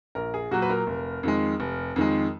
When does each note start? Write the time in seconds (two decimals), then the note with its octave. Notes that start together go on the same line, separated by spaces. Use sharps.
0.15 A#1 A#4
0.34 G#4
0.51 A#2 F#3 F#4
0.62 B4
0.70 A#4
0.87 F1
1.23 F2 D#3 G#3
1.60 F1
1.96 F2 D#3 G#3